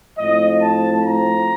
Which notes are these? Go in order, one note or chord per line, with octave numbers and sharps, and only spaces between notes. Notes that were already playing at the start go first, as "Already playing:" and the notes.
A2 F3 C4 D#5
A5
A#5